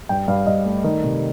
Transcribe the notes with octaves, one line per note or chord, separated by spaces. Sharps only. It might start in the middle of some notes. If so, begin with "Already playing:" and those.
G2 G5
G2 F5
G2 D#5
A3
D#3
C3